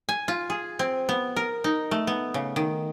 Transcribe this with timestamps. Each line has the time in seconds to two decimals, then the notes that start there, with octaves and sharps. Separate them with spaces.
0.09 G#5
0.28 F4
0.50 G#4
0.79 C4
1.09 B3
1.36 A#4
1.64 D#4
1.91 A3
2.07 B3
2.34 C#3
2.56 D#3